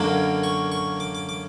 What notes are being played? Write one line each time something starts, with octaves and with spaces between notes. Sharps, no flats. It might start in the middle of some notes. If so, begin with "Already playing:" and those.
Already playing: F#2 D3 F#3 A#3 D4 D6
C#6
C#6
D6
D6
D6